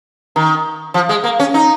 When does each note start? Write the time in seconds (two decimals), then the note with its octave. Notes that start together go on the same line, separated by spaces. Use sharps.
0.36 D#3
0.94 F3
1.09 G#3
1.24 A#3
1.39 C#4
1.54 D#4